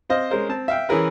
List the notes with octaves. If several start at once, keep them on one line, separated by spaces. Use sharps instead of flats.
C4 C5 D#5 F5
G#3 C#4 A#4 C5
C4 A5
E5 F5 G5
E3 C#4 G#4 A#4 B4